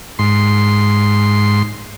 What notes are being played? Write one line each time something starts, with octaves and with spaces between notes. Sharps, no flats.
G#2 C6